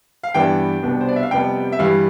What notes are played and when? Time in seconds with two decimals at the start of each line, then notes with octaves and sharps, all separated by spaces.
0.23 F5
0.34 G2 E3 B3 D4 G5
0.83 C2 B2 B3 D4
1.01 C5
1.08 D5
1.16 E5
1.23 F5
1.31 F2 C3 G3 B3 G5
1.72 E5
1.79 G2 E3 G3 F5